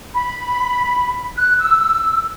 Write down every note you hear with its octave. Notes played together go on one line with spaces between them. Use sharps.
B5
F#6
E6